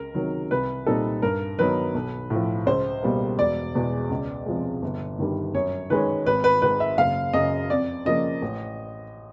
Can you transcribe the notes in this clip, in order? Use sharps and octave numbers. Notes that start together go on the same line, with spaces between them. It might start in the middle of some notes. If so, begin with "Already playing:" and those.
Already playing: C#2 A#4
C3 D#3 F#3
C2 B4
A#2 G3 C4 D#4 A4
G2 A#4
D#3 F#3 B3 D#4 B4
B1
A2 F3
C#2 C5
B2 G3 A#3
E1 D5
E2 B2 G#3
C#2
C3 F3 G#3
G1
G2 D#3 G3
F#2 C#5
D#3 G#3 C#4 B4
G#1 B4
B4
G#2 D#3 B4
E5
F#1 F5
F#2 C#3 D#5
F2 D5
C#3 F3 A#3 D#5
A1